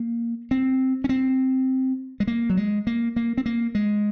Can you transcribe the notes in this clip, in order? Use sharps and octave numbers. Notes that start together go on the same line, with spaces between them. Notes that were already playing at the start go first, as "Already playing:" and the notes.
Already playing: A#3
C4
C#4
C4
G#3
A#3
F#3
G#3
A#3
A#3
C4
A#3
G#3